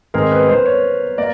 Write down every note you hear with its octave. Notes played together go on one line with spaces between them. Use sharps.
G#2 D#3 G#3 C4 A#4
B4
C5
C#5
A#3 D5